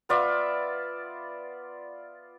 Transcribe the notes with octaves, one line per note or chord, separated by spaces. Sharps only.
B3 F4 D5 E5